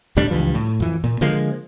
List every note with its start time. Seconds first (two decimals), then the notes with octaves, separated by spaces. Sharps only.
0.16 D#2 A2 G3 D4
0.30 C#2 G2 E3 F3
0.54 A2
0.80 F2 E3
1.04 A#2
1.21 D3 F3 G#3 A#3